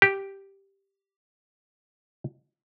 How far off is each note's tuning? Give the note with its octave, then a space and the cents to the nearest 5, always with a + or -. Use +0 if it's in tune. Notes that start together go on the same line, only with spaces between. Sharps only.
G4 +0